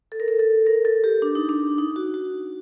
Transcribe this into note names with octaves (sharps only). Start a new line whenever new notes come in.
A4
A#4
A4
A4
A#4
A4
G4
D4
D#4
D4
D#4
F#4
F#4